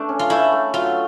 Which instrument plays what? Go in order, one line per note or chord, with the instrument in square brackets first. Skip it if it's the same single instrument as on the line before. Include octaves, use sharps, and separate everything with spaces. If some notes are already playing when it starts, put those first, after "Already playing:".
Already playing: [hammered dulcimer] A3 [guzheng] D4
[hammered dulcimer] C#4
[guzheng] F4
[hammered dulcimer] A3 [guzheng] E4
[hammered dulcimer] A3
[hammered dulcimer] F#3 [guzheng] F4